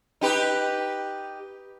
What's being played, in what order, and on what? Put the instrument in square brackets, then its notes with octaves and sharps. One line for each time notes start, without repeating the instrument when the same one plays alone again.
[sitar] D#4 G4 B4